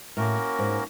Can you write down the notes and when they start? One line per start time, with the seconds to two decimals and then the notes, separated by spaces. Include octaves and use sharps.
0.17 A2 A#3 C#4 F#4 A#4
0.59 G#2